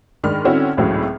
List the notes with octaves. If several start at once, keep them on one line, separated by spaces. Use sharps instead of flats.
G#2 D#3 G#3 D4 B5 F6
D3 G3 C4 C#4 E4 F#4
G#1 C#2 A2 E3 F#3